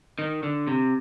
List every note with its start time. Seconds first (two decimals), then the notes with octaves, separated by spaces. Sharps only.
0.19 D#3
0.43 D3
0.67 C3